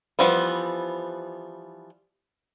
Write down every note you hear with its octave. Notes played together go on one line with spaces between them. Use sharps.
E3 F3 G3 B3